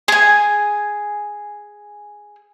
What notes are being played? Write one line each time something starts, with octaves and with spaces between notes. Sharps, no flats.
G#4 G#5